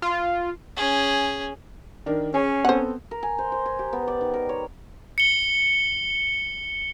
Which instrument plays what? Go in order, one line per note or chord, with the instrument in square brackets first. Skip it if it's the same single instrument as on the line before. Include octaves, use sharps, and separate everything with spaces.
[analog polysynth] F4
[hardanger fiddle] C#4 G#4
[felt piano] D#3 D4 A#4
[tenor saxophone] C#4 [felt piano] G#4 C#5
[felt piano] B3 C4 A4 [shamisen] C5 F#5
[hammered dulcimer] A#4
G#5
C5
C5
G#5
G4
B3
D5
D#3
A#4
C#5
[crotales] C#7 G7